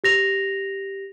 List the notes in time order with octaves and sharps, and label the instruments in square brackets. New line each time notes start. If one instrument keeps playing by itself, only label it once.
[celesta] G4 A#6 F7